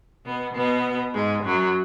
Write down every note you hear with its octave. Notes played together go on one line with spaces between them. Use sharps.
B2 B3
B2 B3
G#2 G#3
F#2 F#3